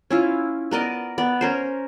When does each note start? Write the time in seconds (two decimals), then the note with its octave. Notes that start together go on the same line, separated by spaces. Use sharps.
0.11 C#4 E4 F4
0.71 B3 A#4 D5 D#5
1.18 B3 D5
1.41 C#4 A#4 C5